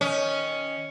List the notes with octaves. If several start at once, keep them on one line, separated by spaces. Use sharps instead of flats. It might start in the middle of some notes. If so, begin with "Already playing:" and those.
D#3 C#4